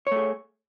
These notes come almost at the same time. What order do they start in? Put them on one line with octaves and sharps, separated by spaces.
C#5 A3 G#4